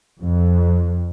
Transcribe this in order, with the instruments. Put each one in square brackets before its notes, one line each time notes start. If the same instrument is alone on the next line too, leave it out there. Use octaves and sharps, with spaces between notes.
[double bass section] F2